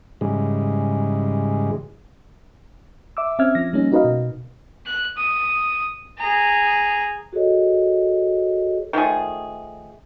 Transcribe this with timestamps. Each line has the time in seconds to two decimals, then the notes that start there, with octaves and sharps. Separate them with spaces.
0.21 G#2 C#3 E3 G3 G#3
3.17 E5 D6 E6
3.39 C4 C#4 E5 E6 F6 G#6
3.55 F3 A#6
3.73 G3 A#3 C#4 D#4
3.92 D#4 F#4 A#4 B4 D#5 F5
4.04 B2
4.86 F#6
5.17 D#6
6.18 G#4 A#5
7.33 F#4 G#4 A4 C#5 D#5
8.93 D#3 F3 A3 G#4